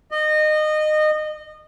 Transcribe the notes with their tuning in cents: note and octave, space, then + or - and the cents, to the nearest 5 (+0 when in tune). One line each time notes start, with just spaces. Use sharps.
D#5 -25